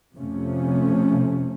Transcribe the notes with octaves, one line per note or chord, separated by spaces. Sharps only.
F2 C3 F3 A3 C#4